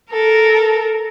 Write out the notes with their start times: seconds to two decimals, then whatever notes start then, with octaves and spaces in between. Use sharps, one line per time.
0.13 A4 A#4